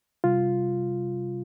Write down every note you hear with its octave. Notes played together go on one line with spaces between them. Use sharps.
C3 G3 F4